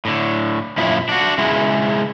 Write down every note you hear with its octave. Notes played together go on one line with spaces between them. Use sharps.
A2 D3
F#2 A#2 F3 E4
D4 F#4
C#3 G#3 E4